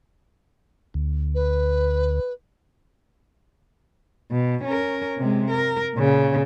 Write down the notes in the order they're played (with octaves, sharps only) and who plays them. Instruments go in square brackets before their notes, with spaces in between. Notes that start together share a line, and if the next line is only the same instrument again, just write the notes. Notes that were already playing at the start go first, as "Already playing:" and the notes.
[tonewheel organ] D2
[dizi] B4
[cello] B2
C#4 A#4
C3 G#3
A#4
A#2 C#3